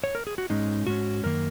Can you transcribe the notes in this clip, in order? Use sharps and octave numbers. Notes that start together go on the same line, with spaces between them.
C#5
A#4
G#4
F#4
G#2 G#3 C#4 D#4
G#2 G#3 C#4 F#4
F#2 D#3 A#3 A#4